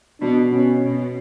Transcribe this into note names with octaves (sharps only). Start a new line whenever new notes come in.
B2 D4
B2 C#4
B2